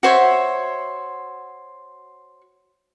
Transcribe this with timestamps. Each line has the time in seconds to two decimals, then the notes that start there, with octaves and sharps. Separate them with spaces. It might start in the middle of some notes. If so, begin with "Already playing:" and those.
0.03 F#4 C5 C#5 E5